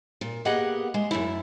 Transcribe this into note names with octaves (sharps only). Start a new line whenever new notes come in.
A#2
A#3 B3 G4 G#4 D#5 F#5
G#3
F#2 F#3 A3 E4